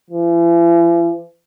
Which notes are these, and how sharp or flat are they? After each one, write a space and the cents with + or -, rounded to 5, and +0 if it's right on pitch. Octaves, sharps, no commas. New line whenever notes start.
E3 +45